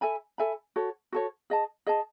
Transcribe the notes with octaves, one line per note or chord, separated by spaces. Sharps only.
A4 E5 G#5 B5
A4 E5 G#5 B5
F#4 A4 C#5
F#4 A4 C#5
G#4 D#5 A5
G#4 D#5 A5